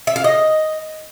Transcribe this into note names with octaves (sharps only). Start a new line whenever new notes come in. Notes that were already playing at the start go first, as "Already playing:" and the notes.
E5
F5
D#5